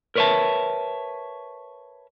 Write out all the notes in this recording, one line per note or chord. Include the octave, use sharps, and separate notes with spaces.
A#4 B4 C#5 D5 E5 A5